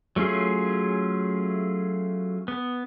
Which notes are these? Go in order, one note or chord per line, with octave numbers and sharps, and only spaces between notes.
F#3 A3 C#4 F4 G#4
B3